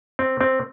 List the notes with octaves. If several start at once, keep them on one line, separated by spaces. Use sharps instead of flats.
C4
C4